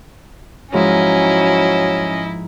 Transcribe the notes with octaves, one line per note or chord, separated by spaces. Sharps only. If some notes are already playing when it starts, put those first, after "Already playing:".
G#2 F3 F#3 C#4 E4 D#5